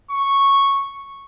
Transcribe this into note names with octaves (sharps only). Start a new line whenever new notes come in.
C#6